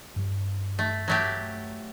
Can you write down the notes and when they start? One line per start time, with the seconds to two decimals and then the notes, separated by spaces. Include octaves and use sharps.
0.16 G2 G3
0.79 A3
1.08 F#3 A3 G4